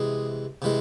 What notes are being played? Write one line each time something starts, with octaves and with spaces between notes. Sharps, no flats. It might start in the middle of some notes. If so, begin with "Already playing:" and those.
Already playing: C3 E3 G#3 G#4
C3 E3 G#3